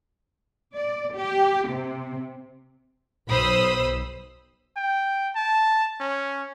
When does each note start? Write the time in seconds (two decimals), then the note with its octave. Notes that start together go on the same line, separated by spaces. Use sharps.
0.75 D5
1.16 G4
1.68 C3
3.28 B1 C5 B5 D#6 E6
4.76 G5
5.36 A5
6.00 C#4